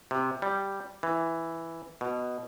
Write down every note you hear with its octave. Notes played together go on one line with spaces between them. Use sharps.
C3
G3
E3
B2